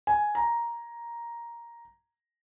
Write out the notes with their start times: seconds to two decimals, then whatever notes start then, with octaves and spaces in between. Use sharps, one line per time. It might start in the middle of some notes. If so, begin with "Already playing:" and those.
0.07 G#5
0.35 A#5